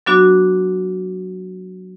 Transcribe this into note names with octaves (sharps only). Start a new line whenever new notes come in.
F#3 B3 D4 F#4